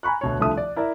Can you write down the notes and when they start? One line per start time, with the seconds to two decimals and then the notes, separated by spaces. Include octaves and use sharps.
0.03 G#5 A#5 B5 C#6 F#6
0.21 D2 B2 C#5
0.39 C2 D3 F3 A3 E5 D#6
0.57 D5
0.76 E4 A#4 D5 E5